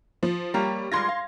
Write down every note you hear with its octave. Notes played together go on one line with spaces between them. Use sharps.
F3
G3 A#3 G4 C#5
G3 G#3 F4 C6 G#6 A#6
F5